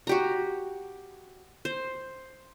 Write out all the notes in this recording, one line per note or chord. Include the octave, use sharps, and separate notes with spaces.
F#4 G4 A#5
C5